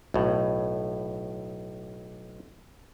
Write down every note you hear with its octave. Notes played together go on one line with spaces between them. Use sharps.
B1 A2